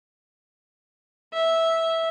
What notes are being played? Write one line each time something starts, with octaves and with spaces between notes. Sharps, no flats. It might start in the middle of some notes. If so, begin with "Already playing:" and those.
E5